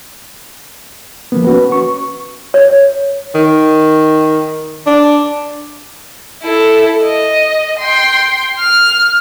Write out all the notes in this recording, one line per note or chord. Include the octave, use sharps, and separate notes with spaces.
F3 A#3 B3
C#4 F#4 B4
C#6
C#5
D#3
D4
E4 A4
D#5
G5 C6
F6